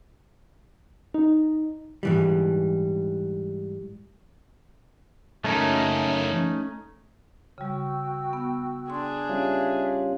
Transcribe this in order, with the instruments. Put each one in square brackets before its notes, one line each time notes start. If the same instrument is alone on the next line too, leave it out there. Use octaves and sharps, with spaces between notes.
[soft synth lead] D#4
[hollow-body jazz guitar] G#2 E3 G3
[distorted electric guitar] F#2 A#3 [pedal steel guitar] A3 C#4 D#4
[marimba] C#3 G3 [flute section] F#4 G5 E6
[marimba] B3
[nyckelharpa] D4 G#4 [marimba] C6
[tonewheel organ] G3 C#4 F4 [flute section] E5 F5